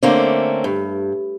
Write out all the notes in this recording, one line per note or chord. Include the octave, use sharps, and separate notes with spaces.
D3 A3 A#3 C4 C#4
G2